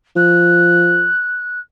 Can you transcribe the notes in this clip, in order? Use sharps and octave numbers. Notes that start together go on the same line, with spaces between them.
F3 F#6